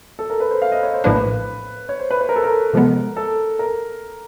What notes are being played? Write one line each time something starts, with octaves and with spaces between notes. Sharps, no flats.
A4
A#4
B4
C5
F5
D#5
C#5
C5
A#1 A2 F3 A#3 D4 B4
C#5
C5
B4
B4
A#4
A4
A#4
C3 F3 G#3 B3
A4
A#4